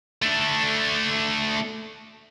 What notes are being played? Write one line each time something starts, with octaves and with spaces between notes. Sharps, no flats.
A3 D4